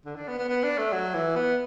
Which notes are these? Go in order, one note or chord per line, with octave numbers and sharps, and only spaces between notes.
D3
D4
B3
B3
B3
D4
A3
F#3
E3
B3